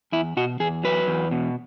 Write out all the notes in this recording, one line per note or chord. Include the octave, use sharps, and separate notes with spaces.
E2 E4
B2 F#4
E2 G#4
F#3 B4
E2
B2